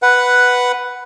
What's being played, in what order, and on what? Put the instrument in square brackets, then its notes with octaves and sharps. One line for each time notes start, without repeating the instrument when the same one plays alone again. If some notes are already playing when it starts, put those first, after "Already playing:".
[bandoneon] B4 F#5